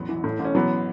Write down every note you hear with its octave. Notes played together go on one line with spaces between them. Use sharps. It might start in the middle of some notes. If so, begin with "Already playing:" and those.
Already playing: A1 E2 F#3 B3
E3
A2
A1
C#4
E3 F#3 B3